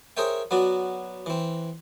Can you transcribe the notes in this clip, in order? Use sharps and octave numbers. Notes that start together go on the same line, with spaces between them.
G#4 A#4 C5 C#5 E5 G5
F#3 B3 F#4 D5
E3 C4